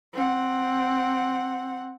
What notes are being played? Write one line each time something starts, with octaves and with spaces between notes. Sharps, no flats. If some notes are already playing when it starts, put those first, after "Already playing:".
C4 F#5